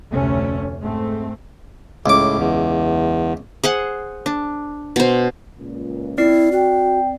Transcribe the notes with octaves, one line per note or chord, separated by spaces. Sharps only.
F1 D2 C3 A3 C#4
G#2 A3 C4
C#2 A2 D6
E2
G#4 C5 F#5
D4
B2 C5
C#2 A#2
C4 E4 D5 C7
F#4 G5